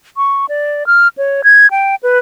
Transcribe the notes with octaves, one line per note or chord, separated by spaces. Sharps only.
C#6
D5
F6
C#5
G#6
G5
B4